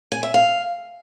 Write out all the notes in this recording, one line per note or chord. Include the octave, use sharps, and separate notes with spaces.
G#5
E5
F5